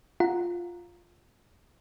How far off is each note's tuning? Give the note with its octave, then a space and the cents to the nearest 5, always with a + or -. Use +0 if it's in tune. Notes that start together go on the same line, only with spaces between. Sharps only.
F4 +0 F#5 +0 A#5 -5